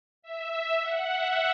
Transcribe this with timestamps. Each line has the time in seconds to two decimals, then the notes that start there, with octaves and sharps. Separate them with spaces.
0.22 E5
0.81 F#5
1.10 E5